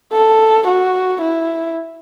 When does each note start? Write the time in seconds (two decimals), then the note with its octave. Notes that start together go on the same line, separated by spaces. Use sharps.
0.13 A4
0.67 F#4
1.21 E4